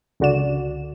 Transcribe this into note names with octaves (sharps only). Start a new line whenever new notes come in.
C#2 D3 F#4 D5 E7